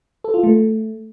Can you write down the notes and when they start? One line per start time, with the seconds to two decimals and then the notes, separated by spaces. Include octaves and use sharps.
0.24 A4
0.34 F4
0.43 A3